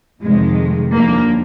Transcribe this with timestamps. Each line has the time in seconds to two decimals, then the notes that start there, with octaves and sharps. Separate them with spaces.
0.23 F2 C3 D#3 G#3
0.94 D#2 D3 F3 A#3